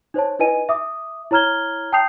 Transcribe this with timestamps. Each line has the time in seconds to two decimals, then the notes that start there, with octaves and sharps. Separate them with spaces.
0.14 D#4 C5 C#5 A5
0.39 D#4 E4 B4 D#5 G#5 D#7
0.69 E5 D6 D#6
1.31 E4 C#5 A#5 F6 G#6 G7
1.93 G5 A5 D#6 G6 C7 F7